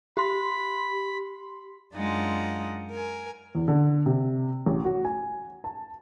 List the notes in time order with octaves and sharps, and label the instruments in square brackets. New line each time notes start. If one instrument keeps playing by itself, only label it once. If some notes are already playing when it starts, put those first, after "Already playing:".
[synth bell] G4 C6 [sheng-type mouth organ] B5
[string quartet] F#2 G#3 D4 D#4 F4 F#5
A#4 G#5
[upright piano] E2
D3
C3
A1
F#4
G#5
A5